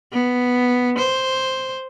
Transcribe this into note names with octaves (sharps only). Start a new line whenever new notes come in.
B3
C5